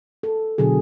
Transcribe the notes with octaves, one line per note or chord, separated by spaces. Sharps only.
A4
B2 D3 F#3 G#4